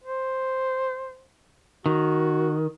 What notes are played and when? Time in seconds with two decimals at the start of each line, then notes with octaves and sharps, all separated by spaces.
0.04 C5
1.86 D#3 F#4